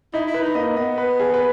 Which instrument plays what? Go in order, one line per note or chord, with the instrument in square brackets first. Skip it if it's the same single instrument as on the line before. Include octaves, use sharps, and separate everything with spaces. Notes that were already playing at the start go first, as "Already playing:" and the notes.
[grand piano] D#4 [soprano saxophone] E4
[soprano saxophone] E4
[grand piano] B4
[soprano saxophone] D#4
[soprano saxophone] A#3 [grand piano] D#5
[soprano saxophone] B3 [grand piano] D#5
[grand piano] B4
G#4
B4